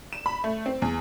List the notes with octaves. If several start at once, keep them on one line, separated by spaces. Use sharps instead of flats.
E7
B5
A3
C4
E2